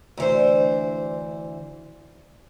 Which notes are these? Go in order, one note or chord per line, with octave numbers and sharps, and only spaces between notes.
D2 E3 C5